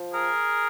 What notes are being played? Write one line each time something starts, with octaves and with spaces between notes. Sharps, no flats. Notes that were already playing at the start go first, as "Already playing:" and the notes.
Already playing: F3
G#4 A#4